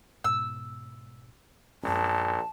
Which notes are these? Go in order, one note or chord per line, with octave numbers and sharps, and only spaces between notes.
G#2 B2 E6
A#1 F#2 G#3 C#4 A5